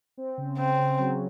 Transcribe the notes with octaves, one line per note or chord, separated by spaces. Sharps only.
C4
C#3
C#3 C4
C#3
F#3